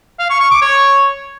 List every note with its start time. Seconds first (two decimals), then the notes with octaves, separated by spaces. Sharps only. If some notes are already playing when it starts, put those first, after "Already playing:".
0.19 F5
0.30 C#6
0.40 C#6
0.51 D6
0.61 C#5